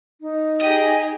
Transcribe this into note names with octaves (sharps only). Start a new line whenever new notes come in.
D#4
G4 G#4 D#5